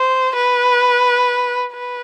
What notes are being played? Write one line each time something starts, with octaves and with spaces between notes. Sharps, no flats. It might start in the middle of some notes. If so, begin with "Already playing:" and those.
Already playing: C5
B4
B4